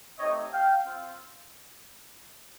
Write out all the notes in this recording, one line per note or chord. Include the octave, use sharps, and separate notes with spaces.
A3 C4 D#4 G4 C#5 D#5
F5 G5
C4 F4